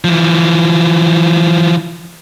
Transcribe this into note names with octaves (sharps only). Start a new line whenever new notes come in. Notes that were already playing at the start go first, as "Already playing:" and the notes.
E3 F3